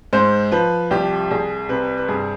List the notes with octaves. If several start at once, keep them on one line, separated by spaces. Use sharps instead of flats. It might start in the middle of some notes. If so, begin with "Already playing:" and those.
G#2 C5
F3 B4
C2 G4
C2 G#4
C3 B4
B4
G2 G#4